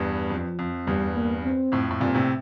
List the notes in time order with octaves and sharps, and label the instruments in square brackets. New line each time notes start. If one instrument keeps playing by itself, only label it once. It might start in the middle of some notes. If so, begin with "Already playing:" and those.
Already playing: [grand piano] E2 G2
[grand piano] F2 [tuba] F3
[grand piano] F2
[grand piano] E2 G2 [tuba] G3
[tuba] A#3
C4
[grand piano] F2 A2
A2
[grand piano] G2 A#2 [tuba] C4
[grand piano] A2 C3